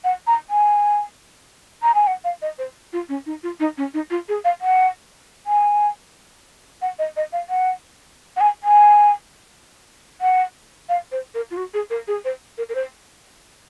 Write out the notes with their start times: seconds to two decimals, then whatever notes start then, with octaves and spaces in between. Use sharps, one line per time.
0.04 F#5
0.27 A#5
0.50 G#5
1.83 A#5
1.95 G#5
2.07 F#5
2.24 F5
2.42 D#5
2.58 C5
2.93 F4
3.09 C#4
3.26 D#4
3.43 F4
3.60 D#4
3.78 C#4
3.94 D#4
4.11 F4
4.29 G#4
4.45 F5
4.61 F#5
5.47 G#5
6.82 F#5
6.99 D#5
7.17 D#5
7.33 F5
7.50 F#5
8.36 F#5
8.41 G#5
8.64 G#5
10.21 F#5
10.89 F5
11.12 C5
11.34 A#4
11.51 F4
11.57 F#4
11.74 G#4
11.90 A#4
12.08 G#4
12.25 C5
12.58 A#4
12.69 A#4
12.75 C5